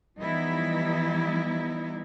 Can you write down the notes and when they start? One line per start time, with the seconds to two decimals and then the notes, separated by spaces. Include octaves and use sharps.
0.20 E3 F3 G3 B3 D#4 E4